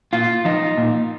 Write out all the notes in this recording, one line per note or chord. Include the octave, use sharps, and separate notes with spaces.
A#2 F4
F3 D#4
A#2